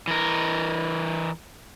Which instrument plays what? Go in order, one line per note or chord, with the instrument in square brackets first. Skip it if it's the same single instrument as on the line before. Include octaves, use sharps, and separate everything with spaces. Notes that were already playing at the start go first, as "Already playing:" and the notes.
[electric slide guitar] E3 A#4